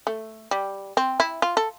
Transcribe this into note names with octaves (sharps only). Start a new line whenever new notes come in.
A3
G3
C4
E4
F4
A4